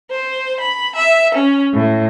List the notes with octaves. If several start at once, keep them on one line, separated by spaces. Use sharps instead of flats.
C5
B5
E5
C#4
A2